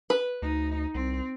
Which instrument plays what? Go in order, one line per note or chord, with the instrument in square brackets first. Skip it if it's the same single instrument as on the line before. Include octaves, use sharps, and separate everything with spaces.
[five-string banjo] B4
[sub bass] D2 [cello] D#4
[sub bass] C2 [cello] C4